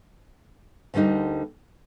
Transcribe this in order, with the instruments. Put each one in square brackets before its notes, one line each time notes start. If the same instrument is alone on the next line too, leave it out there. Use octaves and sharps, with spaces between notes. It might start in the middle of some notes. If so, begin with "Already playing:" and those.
[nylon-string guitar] D2 D3 G3 A#3 D#4